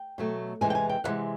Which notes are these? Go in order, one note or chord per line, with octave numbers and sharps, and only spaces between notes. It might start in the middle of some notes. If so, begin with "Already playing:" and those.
Already playing: G5
B2 F#3 A3
E2 C3 E3 G#3 G#5
G5
G#5
G5
E2 C3 E3 G#3 F#5